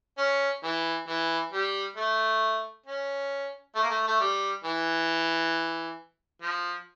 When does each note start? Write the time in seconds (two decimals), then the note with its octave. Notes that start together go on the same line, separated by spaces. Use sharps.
0.18 C#4
0.63 E3
1.08 E3
1.53 G3
1.96 A3
2.86 C#4
3.75 A3
3.83 A#3
3.89 A3
4.07 A3
4.20 G3
4.64 E3
6.42 F3